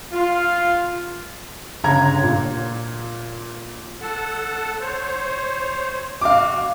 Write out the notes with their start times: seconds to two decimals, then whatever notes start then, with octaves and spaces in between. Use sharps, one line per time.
0.12 F4
1.84 G1 C#3 A#5 G#6
2.23 A#2
4.01 A4 F#5 A5
4.81 C5 C#5
6.21 F#4 F5 D6